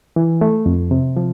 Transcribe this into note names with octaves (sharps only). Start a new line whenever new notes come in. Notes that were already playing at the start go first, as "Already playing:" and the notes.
E3
A3
F2
C3
F3